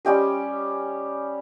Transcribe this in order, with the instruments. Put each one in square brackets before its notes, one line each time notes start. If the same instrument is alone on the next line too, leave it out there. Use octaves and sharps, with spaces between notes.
[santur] G3 C#4 G4 D#5